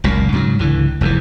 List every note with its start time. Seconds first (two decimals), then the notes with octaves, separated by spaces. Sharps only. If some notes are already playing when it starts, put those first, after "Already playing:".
0.04 F#1 C#2 A#2
0.33 G#2 C#3 F3 F#3
0.59 C#2 D3 E3
1.01 F1 E2 C3 E3